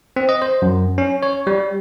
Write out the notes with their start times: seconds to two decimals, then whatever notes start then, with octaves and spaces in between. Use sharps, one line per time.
0.16 C4
0.29 D#5
0.42 C5
0.62 F#2
0.98 C#4
1.23 C#5
1.47 G3